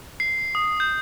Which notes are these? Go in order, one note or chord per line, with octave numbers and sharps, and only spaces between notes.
C7
D#6
G6